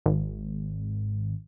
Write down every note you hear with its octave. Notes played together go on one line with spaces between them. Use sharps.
G#1